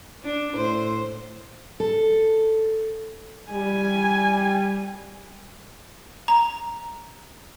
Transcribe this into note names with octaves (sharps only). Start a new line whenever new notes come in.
D4
A2 C5
A4
G3 G#5
A#5